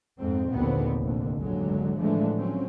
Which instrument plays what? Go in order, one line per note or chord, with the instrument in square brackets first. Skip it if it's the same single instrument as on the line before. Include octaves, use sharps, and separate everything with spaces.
[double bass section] F2 G#2 C4
A#1 D#2 A#2 D3 B3 C4
F1 A#1 D#2 D3
A1 D#2 G#2 D3 F#3 G#3
A2 D3 E3 F3 G#3 A3
F3 F#3 C4 C#4